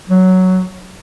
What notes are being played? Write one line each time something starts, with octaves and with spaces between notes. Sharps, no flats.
F#3